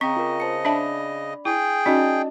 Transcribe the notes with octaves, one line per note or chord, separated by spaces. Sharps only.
C#3 C4 D#5 G5 A#5 C#6
F4 A#4
C5 A5 C#7
D4 D5 E5 A5 B5
E4 G#4 G5
C#4 D#4 F#4 D5 D#5 A5